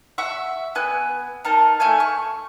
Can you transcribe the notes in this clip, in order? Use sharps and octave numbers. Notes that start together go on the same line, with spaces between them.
E5 F#5 C#6
B3 G#5 F#6
D#4 A#4 A5
A3 E5 G#5 F6
C#6